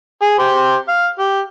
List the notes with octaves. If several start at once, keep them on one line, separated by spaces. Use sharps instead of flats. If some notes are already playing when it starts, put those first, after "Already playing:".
G#4
G4 C5
F5
G4